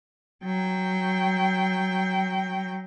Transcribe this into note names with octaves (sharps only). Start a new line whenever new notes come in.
F#3 G5